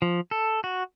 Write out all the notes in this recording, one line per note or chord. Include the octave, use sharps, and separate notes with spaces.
F3
A4
F#4